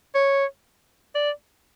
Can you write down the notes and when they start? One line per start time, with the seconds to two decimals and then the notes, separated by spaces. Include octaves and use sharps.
0.15 C#5
1.15 D5